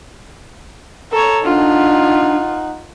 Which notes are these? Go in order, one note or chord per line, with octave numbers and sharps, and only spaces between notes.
A4 C#5 A#5
D4 D#4 F4 F#5